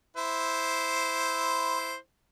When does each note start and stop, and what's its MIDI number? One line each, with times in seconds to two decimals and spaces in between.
0.17 1.95 64
0.17 1.95 72